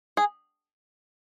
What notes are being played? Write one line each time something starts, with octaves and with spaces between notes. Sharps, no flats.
G#4